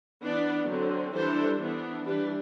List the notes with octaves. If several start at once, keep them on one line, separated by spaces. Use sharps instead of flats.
E3 B3 D4 B4 D5
D3 F#3 C4
E3 G3 D4 A4 C5
E3 B3 D4
E3 G3 D4 G4 B4